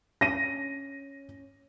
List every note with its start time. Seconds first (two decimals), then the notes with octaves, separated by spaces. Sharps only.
0.21 C#4 A#6 D#7